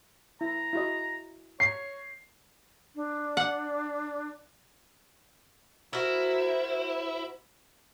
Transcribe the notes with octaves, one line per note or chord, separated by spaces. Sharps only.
E4 A#5
E4 F#4 D#5
C#5 C7
D4
F#5
E4 F#4 A#4 C5